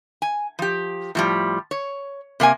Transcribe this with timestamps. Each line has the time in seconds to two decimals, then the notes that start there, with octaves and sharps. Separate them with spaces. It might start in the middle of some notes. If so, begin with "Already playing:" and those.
0.22 G#5
0.59 F3 G4
1.15 A2 F3 G3
1.71 C#5
2.40 C3 A#3 B4 G#5